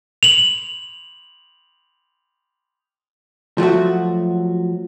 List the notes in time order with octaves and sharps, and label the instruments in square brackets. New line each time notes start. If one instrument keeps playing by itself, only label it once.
[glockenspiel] F7 F#7
[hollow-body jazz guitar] F3 F#3 A3 F#4